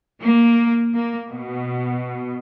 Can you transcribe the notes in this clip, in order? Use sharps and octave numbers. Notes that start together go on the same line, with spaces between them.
A#3
A#3
B2